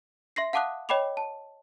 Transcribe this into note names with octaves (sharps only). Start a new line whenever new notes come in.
E5 C6 A#6 C7
F5 F#5 A5 D6 D#6 F#6
C#5 D#5 G5 B5 D6 F7
A5